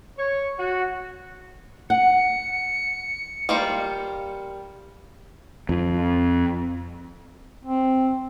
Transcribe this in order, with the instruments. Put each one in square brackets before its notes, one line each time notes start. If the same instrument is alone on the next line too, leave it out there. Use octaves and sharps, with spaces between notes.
[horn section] C#5
F#4
[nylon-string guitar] F#5 [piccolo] C#7
[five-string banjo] G3 A#3 F4
[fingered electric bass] F2
[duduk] C4